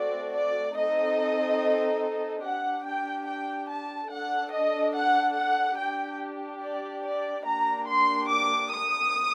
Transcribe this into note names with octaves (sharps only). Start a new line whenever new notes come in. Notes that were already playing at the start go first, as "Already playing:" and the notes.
Already playing: A3 C4 F#4 A4 D5
D5
C4 D#4 A4 D#5
D4 G4 F#5
G5
G5
A5
D4 A4 F#5
D#5
F#5
F#5
D4 G4 G5
D5
D5
A#3 D4 G4 A#5
C6
D6
D#6